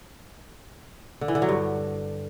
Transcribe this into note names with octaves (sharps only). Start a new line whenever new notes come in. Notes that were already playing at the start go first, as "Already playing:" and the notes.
D3
E3
D3
F#3
G2